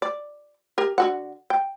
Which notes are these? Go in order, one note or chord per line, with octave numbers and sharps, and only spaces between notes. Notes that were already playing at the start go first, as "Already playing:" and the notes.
D5
G4 A#4
D3 F#4 F#5
G5